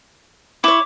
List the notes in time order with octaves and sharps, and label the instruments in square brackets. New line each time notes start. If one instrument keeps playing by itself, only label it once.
[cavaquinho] E4 C#5 [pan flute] D6